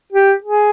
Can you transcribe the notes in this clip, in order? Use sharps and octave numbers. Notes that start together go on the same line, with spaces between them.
G4
G#4